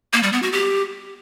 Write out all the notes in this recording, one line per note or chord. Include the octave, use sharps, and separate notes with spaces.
A#3
G3
B3
F#4
G4